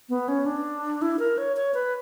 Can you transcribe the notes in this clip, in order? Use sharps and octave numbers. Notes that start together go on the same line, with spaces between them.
B3
C#4
D4
E4
A#4
C#5
C#5
B4